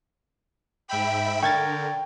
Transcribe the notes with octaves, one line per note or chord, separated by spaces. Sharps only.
G#2 E5 G5 B5
D3 A#4 G5 C#6 G#6 A6